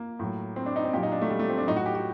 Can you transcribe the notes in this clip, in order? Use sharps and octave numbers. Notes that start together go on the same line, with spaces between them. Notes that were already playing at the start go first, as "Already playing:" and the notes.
Already playing: A#3
A2 F#3
C4
D4
D#4
C4
A#2 F#3 G4
D#4
D4
A3
G3
A3
C4
D4
A2 F#3 D#4
F#4
G4
F#4